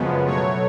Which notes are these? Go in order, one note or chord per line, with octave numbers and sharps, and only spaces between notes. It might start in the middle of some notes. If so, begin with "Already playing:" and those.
Already playing: F#2 C#3 F3 G#3 B3
B2 F#3 A3 C#5